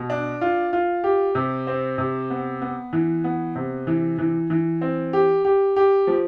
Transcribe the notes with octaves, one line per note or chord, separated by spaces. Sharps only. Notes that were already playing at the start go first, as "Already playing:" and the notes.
Already playing: B2
D4
F4
F4
G4
C3
C4
C3
B3
B3
E3
B3
C3
E3
E3
E3
C4
G4
G4
G4
F3